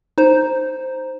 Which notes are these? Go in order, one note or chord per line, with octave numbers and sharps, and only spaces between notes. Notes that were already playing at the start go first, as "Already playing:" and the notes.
D#4 C5